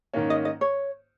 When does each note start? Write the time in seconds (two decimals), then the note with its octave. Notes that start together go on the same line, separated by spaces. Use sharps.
0.14 G#2 D#3 A#3 C#4
0.30 D#5
0.45 D#5
0.61 C#5